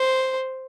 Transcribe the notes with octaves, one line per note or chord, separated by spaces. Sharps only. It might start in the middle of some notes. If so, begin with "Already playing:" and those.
Already playing: C5